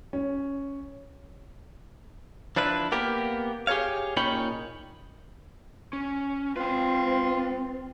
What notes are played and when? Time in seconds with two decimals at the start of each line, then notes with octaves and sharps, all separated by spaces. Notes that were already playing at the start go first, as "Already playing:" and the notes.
0.13 C#4
2.56 F3 D4 E4 B4
2.92 A#3 B3 G4 A#4
3.67 G4 G#4 A#4 C#5 F5
4.17 A#2 C#4 D#4 C#5 G5 B5
5.93 C#4
6.56 C4 F4 B4 G5